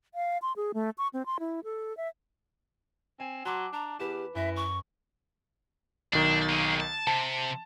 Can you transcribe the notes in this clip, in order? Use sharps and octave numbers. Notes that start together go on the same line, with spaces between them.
F5
C6
G#4
A3
C#6
C4
C6
E4
A4
E5
C4 G#5
F#3 A5 C6 D6
D4 A#5
E2 G4 B4 E7
F#2 E3 E5 A#6
C#6
B1 D#3 D4
A#3 G#4
A5
C3 A5